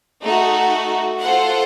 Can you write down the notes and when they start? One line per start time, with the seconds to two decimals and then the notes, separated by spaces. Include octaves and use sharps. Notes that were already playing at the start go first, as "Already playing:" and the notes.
0.23 A3 D#4 F#4
1.21 F4 A4 C5 F#5